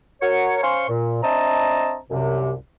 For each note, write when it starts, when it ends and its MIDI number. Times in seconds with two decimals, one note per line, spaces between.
0.22 0.60 66
0.22 0.60 70
0.22 0.60 73
0.63 0.87 61
0.63 0.87 72
0.63 0.87 77
0.63 0.87 80
0.63 0.87 84
0.63 0.87 85
0.89 1.21 46
1.23 1.96 60
1.23 1.96 62
1.23 1.96 75
1.23 1.96 76
1.23 1.96 81
1.23 1.96 82
2.10 2.53 36
2.10 2.53 42
2.10 2.53 48